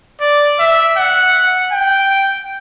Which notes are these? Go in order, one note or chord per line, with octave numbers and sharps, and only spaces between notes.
D5
E5
F#5
G5